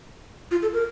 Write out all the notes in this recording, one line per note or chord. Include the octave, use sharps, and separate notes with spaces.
F4
A4
A#4